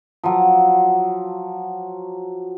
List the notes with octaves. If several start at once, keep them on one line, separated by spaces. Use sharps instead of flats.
F3 F#3